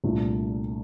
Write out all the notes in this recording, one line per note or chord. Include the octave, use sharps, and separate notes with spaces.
C2 A#2 A3 D4 F4